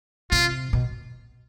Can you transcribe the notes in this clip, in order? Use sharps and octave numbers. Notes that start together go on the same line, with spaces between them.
C3 F4
B2